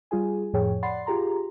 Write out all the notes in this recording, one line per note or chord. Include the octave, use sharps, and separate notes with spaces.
G3 F4 G#4 G#5
F2 A2 F3 G#4 C#5 G5
D5 F#5 B5 C6 A6 C7
F4 G4 G#4 A#5 C6